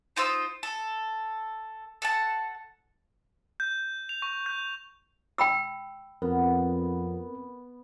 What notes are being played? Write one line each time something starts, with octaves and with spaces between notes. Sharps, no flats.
D#4 F4 C5 E6
A4
A4 F#5 A5
G6
F7
C#6
G6
G5 B5 E6
F2 B3 C4 A#4